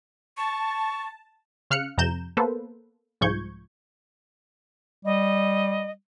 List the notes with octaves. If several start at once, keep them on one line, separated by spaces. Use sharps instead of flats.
A5 C#6
C#3 F5 F6 F#6 C#7
F2 C3 A#5 G6 E7
A#3 B3 A4 B4 C5
C2 G#2 F3 C#6 G6 G#6
G3 D#5